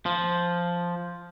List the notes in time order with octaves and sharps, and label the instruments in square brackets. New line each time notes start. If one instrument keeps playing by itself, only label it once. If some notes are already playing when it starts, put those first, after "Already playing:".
[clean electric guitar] F3